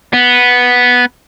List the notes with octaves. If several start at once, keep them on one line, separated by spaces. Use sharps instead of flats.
B3